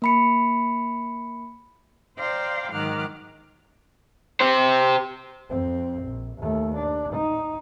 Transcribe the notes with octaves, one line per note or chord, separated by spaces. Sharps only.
A#3 B5 C#7
C5 D5 F5 G5 A#5 C6
G#2 D#3 F#3 F#5 D6 F6
G4 C5
F2 C4
A#1
D#2 A3
D4
D#4